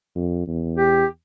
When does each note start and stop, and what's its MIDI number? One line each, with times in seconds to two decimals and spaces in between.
0.15 0.47 41
0.47 1.04 40
0.77 1.06 67